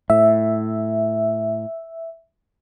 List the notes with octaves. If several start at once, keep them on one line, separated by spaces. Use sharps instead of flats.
A2 E5